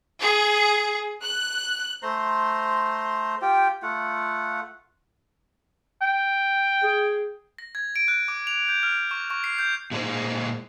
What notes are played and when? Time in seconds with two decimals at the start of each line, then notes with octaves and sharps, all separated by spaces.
0.21 G#4
1.21 F#6
2.03 A3 C5 A#5 C6
3.42 F4 G4 G5
3.83 A3 F4 F#5
6.02 G5
6.83 G#4
7.58 A#6
7.75 G#6
7.96 D7
8.08 F#6
8.28 D6
8.47 F7
8.69 G6
8.83 F6
9.11 C#6
9.30 C#6
9.44 C7
9.58 G6
9.91 A#2 G#3 D4 G#4 C5